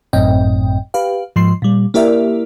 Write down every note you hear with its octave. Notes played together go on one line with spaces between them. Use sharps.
G#1 F#2 A2 C4 D#5 G5
G4 B4 F5
G#2 F3 C6 C7
A#2 G3
A#3 E4 G4 A#4 D5 E5